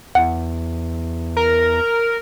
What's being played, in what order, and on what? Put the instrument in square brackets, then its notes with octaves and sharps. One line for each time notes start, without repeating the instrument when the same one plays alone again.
[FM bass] E2 [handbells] F#5
[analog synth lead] A#4